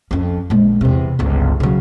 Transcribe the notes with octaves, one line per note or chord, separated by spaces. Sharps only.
F2 C#4
A#1 G#3
E2 C3
G1 C#2
C#3 F#3